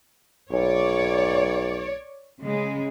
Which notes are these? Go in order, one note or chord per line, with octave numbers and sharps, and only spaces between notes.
B1 C#5 D5
C#3 G#3